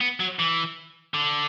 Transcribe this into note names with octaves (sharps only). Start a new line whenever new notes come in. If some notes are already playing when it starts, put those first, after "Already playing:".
B3
F#3
E3
D3